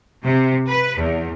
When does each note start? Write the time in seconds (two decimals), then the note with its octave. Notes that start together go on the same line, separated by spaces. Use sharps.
0.24 C3
0.68 B4
0.99 E2